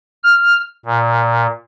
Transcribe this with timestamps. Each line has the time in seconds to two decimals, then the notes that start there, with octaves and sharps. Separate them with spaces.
0.24 F6
0.86 A#2